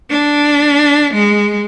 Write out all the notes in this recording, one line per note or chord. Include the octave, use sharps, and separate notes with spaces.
D4
G#3